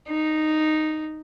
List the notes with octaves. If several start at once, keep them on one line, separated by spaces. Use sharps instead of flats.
D#4